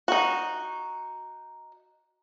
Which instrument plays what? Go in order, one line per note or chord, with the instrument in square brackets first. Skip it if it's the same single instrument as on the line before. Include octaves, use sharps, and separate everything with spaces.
[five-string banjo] D#4 F#4